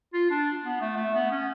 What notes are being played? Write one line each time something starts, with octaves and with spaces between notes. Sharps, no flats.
F4
D4
B3
A3
A3
B3
C#4